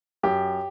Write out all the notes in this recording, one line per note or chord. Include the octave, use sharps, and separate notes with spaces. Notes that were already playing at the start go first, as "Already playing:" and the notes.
F#2 G4